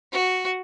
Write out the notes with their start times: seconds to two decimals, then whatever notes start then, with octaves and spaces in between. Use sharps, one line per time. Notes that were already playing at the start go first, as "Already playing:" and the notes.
0.13 F#4